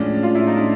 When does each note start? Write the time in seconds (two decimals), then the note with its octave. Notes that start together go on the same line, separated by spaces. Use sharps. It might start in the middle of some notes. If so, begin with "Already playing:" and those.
Already playing: A2 F3 G#3 C#4 D4
0.23 F4
0.35 E4
0.47 D#4
0.57 D4